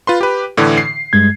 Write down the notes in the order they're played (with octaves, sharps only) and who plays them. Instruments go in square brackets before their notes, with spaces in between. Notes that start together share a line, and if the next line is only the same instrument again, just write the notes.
[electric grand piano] F4 B4 C6
G4 B4
A2 D3 E3
C7
[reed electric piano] G2 G#3 G#6